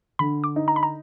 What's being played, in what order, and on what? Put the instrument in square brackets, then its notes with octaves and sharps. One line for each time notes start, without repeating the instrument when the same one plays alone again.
[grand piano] D3 [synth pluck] B5
[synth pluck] D6
[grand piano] D#4
[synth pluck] A#5
B5
A#5